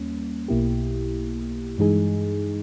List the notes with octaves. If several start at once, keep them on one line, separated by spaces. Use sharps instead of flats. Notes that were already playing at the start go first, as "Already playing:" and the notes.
Already playing: D#2 G3 A#3 C#4
B1 B2 A#3 E4 G4
G2 E3 G#3 D#4 G#4